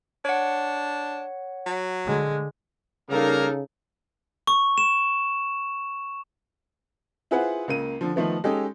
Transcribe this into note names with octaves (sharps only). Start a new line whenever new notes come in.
D4 C#5 F#5
F#3
D3 G#3
C#3 G3 A#3 D#4 A4 A#4
C#6
E7
E4 F4 G#4 B4 C5 F#5
C#2 C#3 A#3 D#7
D3 F3
D#3 F3 A3 B3
G#3 C#4 D#4 G4 A4